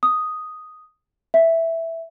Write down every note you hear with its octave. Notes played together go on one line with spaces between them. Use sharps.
D#6
E5